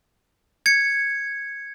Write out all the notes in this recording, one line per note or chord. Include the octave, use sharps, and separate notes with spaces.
G#6 C#7